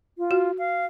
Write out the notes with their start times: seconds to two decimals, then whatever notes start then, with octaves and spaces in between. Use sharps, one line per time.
0.18 F4
0.31 F#4
0.59 F5